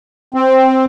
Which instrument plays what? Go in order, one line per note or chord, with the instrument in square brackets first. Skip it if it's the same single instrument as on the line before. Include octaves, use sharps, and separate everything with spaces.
[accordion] C4